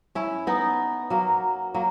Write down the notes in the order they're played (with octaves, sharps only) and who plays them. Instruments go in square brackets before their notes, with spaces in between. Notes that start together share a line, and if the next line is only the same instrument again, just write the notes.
[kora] C#4 E4
B3 D#4
F#3 A#3
F#3 A#3